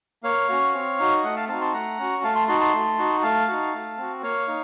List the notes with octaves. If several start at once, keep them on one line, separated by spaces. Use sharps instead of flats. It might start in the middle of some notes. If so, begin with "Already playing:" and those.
A#3 C#5 F5
C#4 F#4
C4
D#4 F#4
A3 D#5 F#5
F5 A5
C4 D#4 F#4 F5 A5
A5 C6
A3 F#5 A#5
C#4 F#4
A3 F5 A5
A5 C6
D#4 F#4 A5 C6
A5 C6
A3
D#4 F#4
A3 F5 A5
D#4 F#4
A3
C4 F#4
A#3 C#5 F5
D#4